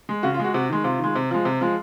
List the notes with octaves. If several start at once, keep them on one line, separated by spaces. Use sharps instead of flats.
G#3
C#3 F#4
F4
G#3 F#4
C3 F#4
D#3 G#3
C3 F4
D#3 G#3
C3
F3 G#3
C3
F3 G#3